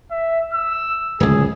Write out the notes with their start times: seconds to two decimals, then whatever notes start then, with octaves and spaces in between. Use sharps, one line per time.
0.11 E5
0.54 E6
1.20 D1 C#2 G#4